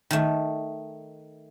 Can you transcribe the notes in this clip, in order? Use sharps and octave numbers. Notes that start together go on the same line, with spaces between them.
D#3 A3